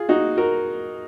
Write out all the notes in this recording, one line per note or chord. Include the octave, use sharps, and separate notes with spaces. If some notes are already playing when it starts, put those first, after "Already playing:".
Already playing: F4 G#4
D#4 F#4
F#4 A#4